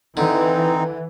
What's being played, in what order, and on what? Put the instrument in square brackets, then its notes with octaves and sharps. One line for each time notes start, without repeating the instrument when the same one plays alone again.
[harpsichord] D3 [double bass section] E3 [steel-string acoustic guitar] B3 [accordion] C4 D#4